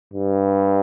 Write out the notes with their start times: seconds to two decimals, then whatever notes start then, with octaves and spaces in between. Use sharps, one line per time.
0.14 G2